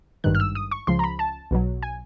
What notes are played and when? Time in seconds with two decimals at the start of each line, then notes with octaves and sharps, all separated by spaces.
0.24 G#1 G2 D#3 F#6
0.35 F6
0.40 E6
0.55 D#6
0.71 C#6
0.87 C#2 C#3 F3 C6
0.99 A#5
1.04 B5
1.19 A5
1.51 B1 B2 F#3
1.83 G#5